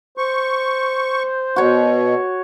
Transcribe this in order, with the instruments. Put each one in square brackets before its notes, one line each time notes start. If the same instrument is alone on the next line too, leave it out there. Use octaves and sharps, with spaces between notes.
[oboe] C5 [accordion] C#6
[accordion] B2 [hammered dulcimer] F#4 C#5